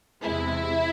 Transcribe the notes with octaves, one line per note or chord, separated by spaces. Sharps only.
E2 C3 G#3 E4